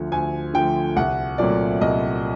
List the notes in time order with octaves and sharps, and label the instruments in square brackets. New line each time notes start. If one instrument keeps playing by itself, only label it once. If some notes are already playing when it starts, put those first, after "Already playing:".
Already playing: [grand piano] D2 D3 F3 A3
D2 G#5
D3 F3 A3 G5
C2 F#5
A#2 F#3 A3 C4 D5
C2 D#5